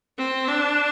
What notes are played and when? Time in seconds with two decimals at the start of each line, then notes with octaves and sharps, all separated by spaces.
0.18 C4
0.48 D4